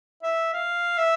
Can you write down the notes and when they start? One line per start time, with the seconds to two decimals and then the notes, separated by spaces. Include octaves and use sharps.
0.23 E5
0.53 F5
0.98 E5